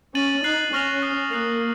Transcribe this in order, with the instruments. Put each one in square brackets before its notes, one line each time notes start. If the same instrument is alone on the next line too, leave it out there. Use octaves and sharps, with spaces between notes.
[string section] C#4 [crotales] A6 D#7 F#7
[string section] D#4 [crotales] F#6 C7 F#7
[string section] C#4 [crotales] C#6 F6 A#6 F7
[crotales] D#6 F#6 C7
[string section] A#3 [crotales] D#6 F#6 A6 C7 F7